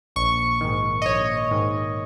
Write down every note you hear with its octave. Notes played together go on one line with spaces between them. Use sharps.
A#1 C#6
G#2 D#3
D#5
A#1 C#5
G#2 D#3